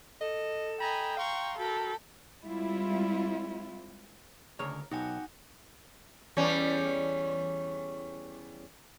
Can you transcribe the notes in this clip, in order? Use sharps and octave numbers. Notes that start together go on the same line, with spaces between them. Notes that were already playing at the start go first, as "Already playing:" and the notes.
A4 D#5
D#5 G5 G#5 A#5 B5
F5 A#5 C6 C#6
F#4 A4 A#4 G5 B5
G3 G#3 C4 E4 F4
D2 C#3 A#4 C#5
B1 D#4 F#4 G4 F#5 G#5
E2 G3 C#4